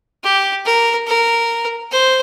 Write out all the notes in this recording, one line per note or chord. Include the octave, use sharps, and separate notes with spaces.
G4
A#4
A#4
C5